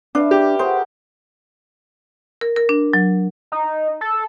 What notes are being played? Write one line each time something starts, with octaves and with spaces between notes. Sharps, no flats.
D4 B4 E5 F5
G4
F#4 G#4 A#4 C5
A#4
A#4
D4
F#3
D#4
A4